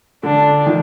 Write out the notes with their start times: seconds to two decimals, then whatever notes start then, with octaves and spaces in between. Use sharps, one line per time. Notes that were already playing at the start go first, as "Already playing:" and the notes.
0.23 D3 D4
0.66 D#3